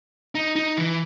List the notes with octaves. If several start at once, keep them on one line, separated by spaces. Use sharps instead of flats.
D#4
D#4
E3